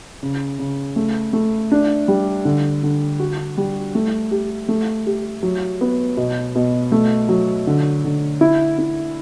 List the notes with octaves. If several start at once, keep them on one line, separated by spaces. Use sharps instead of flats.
C#3
C#3
A3
A3
D4
G3
D3
D3
F#4
G3
A3
G4
A3
G4
F#3
B3
B2
B2
A3
F#3
D3
D3
E4
E4